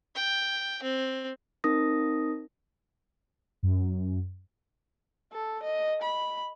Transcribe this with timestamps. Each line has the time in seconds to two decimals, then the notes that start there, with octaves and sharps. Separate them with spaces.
0.15 G5
0.83 C4
1.64 C4 D#4 A#4 D#6 A#6
3.63 F#2
5.33 A4
5.63 D#5
6.03 B5